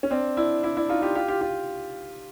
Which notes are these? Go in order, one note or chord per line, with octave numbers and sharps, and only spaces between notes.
C#4
C4 D4
D4 E4
D4 E4
D4 E4
D#4 F4
F4 G4
F4 G4
F4 G4
F4 G4